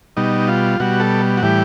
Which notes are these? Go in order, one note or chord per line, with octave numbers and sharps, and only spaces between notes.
B2 G3 D#4
F4
B2 G3 F#4
A4
F#4
A2 E3 G3 G4